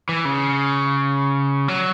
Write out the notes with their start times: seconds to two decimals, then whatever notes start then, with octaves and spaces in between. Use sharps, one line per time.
0.09 E3
0.25 C#3
1.68 F#3